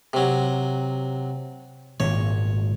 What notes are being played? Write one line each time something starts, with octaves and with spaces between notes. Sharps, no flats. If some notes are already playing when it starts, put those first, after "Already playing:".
C3 F#3
G#1 A#2 C#5